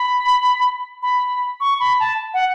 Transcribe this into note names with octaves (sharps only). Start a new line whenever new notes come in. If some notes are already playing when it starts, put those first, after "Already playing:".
Already playing: B5
B5
C#6
B5
A5
F#5